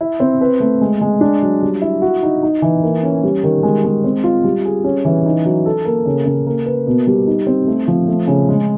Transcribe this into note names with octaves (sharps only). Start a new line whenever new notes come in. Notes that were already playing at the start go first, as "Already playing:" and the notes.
E4
C4
B4
A3
G#3
G#3
D4
F#3
G3
E4
F#4
D#4
D#4
E3
A#3
C#4
G3
D#3
G#3
G#3
C4
F4
G3
G#4
C#4
E3
D#4
F#3
A4
A#3
C#3
C#3
A#3
B4
B2
G3
D#4
C4
A3
F3
A3
C#3
G#3